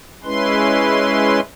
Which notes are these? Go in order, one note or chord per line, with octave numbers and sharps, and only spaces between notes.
G#3 C#4 E4 B4 C6